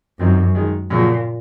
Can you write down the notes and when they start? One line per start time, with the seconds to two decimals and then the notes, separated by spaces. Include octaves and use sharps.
0.19 F#2 D#3 F#3 C4 D#4
0.55 D#3 G#3 D#4
0.90 F#2 A#2 C#3 F3 A#3